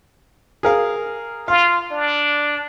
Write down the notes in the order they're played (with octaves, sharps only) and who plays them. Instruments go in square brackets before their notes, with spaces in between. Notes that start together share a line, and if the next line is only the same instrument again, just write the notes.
[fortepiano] G#4 A#4 F5
[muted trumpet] F4 [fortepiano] F5
[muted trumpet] D4